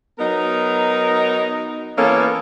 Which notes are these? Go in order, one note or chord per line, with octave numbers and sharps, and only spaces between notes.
F#3 B3 D#4 A#4
E3 A#3 B3 C#4 A4